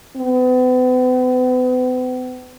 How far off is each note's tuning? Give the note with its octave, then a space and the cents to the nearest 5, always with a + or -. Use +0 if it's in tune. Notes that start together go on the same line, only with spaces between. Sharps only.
B3 +40